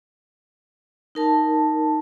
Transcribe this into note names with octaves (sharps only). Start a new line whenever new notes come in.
D#4 A#4 A5